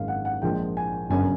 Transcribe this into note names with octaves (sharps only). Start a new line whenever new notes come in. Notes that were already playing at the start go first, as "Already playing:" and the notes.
Already playing: G#1 F#2 D#3 G#3 F5
F#5
F#5
A#1 A#2 F3 G#3 G5
G#5
G1 F#2 C#3 F#3 G#5